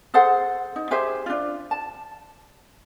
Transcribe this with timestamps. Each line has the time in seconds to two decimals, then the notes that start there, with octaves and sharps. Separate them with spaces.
0.14 G#4 A4 C5 F#5
0.76 D#4
0.91 G4 G#4 C5 E5
1.26 D4 F4
1.71 A5